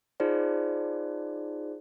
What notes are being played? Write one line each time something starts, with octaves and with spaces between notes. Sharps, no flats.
D#4 F4 G#4 C5 D5